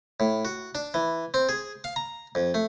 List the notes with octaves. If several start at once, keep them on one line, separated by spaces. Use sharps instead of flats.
A2
F#4
D4
E3
C4
G#4
F5
A#5
F2
A3